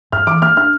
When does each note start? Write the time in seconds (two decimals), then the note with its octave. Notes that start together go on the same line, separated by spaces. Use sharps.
0.12 G2 F6
0.27 E3 D6
0.41 A#3 F6
0.57 D4 F6